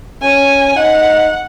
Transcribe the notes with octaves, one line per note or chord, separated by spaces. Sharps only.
C#4 G#5
D#4 F#5